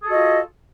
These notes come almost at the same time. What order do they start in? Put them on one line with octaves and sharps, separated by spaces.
G#4 A4 F#4 D#5 F4